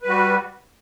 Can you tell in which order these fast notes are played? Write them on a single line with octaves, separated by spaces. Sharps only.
B4 G3 F#4